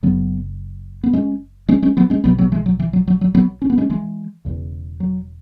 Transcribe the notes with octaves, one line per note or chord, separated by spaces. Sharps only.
F#1 F#2 C#3 F#3 B3
B3
G#3 C#4
G#3 C#4
G#3 C#4
F#3 B3
G#3 C#4
B1 B2 F#3 B3
F#3 B3
E3 G#3
F#3
E3
F#3
F#3
F#3
F#3 B3
C#4
B3
G#3 C#4
E3 G#3
E1 E2 C#3
F#3